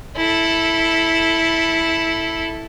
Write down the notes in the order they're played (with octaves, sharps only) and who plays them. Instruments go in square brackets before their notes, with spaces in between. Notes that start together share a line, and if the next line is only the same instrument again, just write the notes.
[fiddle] E4 A4